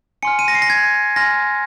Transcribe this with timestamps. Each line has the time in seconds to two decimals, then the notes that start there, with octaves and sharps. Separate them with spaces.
0.23 G#5 C6 F6 C#7
0.39 D#7
0.48 A#6
0.55 C7
0.62 A#6
0.70 G#6
1.16 G#5 C6 F6 A#6